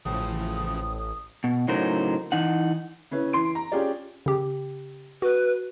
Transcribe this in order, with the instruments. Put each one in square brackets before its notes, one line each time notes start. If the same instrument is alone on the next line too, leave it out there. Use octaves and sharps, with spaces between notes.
[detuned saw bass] A1 [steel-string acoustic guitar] A2 C5 [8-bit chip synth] C#3 E3 F3 [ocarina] D#6
[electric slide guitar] B2
A2 C#3 F#3 D#4 A#4 C5
E3 D#4 F#5
[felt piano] C#3 C#4 E4 B4
E3 C6 D7
A#5
C#4 F4 G4 G#4 D5
[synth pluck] C#3 G4
[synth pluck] F#4 [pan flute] B4